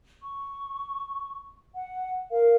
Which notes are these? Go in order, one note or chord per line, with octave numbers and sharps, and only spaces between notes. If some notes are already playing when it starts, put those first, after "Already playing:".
C#6
F#5
A#4 F5